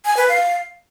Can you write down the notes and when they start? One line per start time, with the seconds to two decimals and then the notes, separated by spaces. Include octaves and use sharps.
0.05 G#5
0.17 B4
0.28 F5